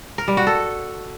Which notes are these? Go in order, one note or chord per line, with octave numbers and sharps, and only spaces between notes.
A#4
G3
F#4
A4